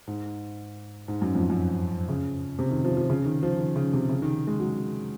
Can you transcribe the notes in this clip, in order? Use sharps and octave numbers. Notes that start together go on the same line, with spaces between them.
G#2
G#2
F#2
F2
F#2
C#3
C3
D#3
F3
F3
C#3
D#3
F3
D#3
C#3
C3
C#3
D#3
G#3
F#3